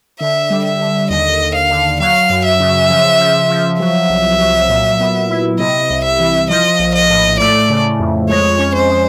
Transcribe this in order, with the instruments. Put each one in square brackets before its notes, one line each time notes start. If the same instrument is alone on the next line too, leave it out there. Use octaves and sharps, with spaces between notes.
[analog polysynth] D3 [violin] E5
[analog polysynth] G3
[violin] E5
[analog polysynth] D3
[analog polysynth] D#2 [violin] D#5
[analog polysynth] D#2
[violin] F5
[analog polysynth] D3
[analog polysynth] F#3 [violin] F5
[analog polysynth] F#2
[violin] E5
[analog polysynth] C#3
F3
F3
F3
[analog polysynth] F#3 [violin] E5
[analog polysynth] C2
F#3
A#2
B3
E4
[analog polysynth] C3 [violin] D#5
[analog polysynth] C2
[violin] E5
[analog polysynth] E3
[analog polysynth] F3 [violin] D#5
[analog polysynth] A#1
[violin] D#5
[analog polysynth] A2
[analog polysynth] A3 [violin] D5
[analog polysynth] C#3
F2
[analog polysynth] G#3 [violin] C#5
[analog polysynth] C#4
[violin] C5
[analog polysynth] G#3